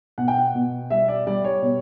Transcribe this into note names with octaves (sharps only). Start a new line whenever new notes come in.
B2 F#5
G5
F#5
B2
G3 E5
D5
G3 D5
C#5
B2